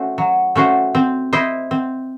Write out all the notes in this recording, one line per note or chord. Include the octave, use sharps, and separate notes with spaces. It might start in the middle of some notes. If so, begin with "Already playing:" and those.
Already playing: A3 C#4 F#4 C5
F#3
A3 C#4 F#4 C5
C4
E4 C5 D#5
C4